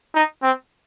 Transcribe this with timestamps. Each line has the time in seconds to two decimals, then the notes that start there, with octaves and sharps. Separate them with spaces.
0.14 D#4
0.42 C4